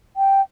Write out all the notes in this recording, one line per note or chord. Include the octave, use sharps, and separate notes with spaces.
G5